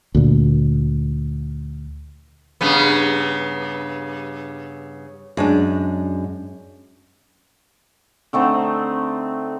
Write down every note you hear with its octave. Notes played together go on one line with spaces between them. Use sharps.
D2 A#2
G2 C#3 B3
F#2 G#3 D4
D3 A3 C4 D#4